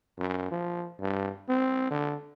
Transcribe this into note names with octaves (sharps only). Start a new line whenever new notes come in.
F#2
F3
G2
C4
D3